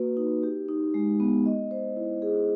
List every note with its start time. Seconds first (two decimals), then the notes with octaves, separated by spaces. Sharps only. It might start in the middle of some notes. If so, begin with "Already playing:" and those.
Already playing: A#3 F#4 B4
0.17 D#4
0.43 G4
0.68 D#4
0.94 G#3
1.20 B3
1.46 D#5
1.71 C5
1.96 E4
2.22 G#4